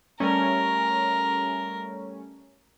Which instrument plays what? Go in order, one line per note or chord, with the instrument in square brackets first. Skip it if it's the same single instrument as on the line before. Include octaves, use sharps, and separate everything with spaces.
[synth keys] G3 A3 C#4 [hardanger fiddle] A#4